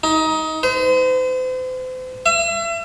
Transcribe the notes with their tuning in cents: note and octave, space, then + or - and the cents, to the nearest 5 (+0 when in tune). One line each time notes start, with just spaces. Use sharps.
D#4 +20
C5 -40
E5 +35